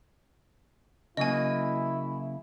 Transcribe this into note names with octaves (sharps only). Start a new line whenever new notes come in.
C#3 F#3 A#3 E4 D#5 G#5